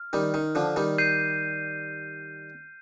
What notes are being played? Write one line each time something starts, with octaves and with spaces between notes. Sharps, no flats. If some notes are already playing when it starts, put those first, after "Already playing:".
Already playing: F6
D#3 G3
D#3
D3 F3
D#3 G3
G6 C7 D#7